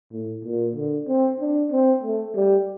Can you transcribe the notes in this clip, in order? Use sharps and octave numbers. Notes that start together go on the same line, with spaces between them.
A2
A#2
D3
C4
D4
C4
A3
G3